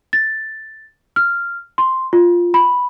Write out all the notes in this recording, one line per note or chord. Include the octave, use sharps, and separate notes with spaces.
A6
F6
C6
F4
B5